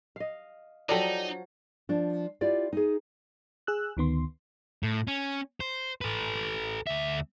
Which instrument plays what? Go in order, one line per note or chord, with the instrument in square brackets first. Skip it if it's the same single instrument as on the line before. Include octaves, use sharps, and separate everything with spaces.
[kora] D#5 F5
[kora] F3 F#3 [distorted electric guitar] D#4 [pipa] G4 A4 D5
[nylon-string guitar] F3 D4
E4 F4 G4 D5
D#4 G#4
[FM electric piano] G#4 E6 F#6
D2 D#3 B3 C6
[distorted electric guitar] A2
C#4
C5
A4 B4
D2 E5